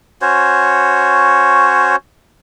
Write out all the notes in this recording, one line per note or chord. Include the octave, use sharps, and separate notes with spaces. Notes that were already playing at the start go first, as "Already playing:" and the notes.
C#4 F#4 C5 C#5